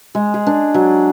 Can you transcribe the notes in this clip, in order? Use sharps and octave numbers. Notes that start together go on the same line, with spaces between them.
G#3
G#4
D4
F#3